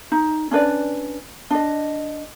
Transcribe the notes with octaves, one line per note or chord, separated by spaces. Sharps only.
D#4
C#4 D4 B4 D5
D4 D#5